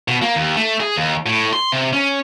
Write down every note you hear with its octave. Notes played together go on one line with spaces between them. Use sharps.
B2
A#3
D#2
A3
G#4
D#2
A2
C6
C3
C#4